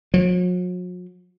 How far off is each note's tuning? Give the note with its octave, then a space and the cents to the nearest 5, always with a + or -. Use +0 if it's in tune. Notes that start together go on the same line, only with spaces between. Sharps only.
F#3 -45